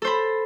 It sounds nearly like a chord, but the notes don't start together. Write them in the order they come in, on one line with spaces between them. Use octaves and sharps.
A4 C5 B5